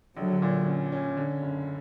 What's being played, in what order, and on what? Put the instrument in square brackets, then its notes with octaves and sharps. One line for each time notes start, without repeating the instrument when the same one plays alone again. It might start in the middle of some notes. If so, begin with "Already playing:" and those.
[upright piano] A#1 [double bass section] D3 F#3
[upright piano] A#2
C#4
C#4
D3
F#1